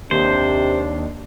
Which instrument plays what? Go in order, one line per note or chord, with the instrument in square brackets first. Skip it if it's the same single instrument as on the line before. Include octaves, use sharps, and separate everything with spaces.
[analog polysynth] D#2 [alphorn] C3 [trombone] D4 [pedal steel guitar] C5